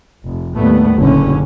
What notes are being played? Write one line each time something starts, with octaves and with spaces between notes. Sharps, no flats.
F1
D#2 A2 G3 A3 B3
F#1 A#2 D3 C#4